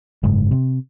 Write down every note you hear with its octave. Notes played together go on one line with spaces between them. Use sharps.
F#1 G#2
C3